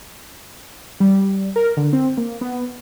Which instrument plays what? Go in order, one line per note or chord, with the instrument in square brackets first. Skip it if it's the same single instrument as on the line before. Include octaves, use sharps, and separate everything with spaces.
[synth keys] G3
A#4
D3
C4
A#3
B3